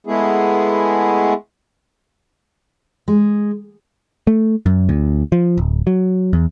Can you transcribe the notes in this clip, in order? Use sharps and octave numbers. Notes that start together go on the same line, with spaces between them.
G#3 A3 B3 E4 G#4
G#3
A3
F#2
D2
F3
D1
F#3
E2